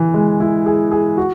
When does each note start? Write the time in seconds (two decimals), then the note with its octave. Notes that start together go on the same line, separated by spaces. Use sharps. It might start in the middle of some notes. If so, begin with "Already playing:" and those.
Already playing: E3
0.14 G#3
0.40 E4
0.66 G#4
0.91 G#4
1.17 F#4